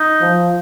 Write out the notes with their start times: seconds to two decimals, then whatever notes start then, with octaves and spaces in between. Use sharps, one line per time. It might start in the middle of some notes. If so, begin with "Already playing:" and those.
Already playing: D#4
0.21 F3